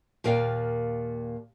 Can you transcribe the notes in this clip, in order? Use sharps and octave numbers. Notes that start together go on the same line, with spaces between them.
D#2 A#2 A#4 D5 F5 G5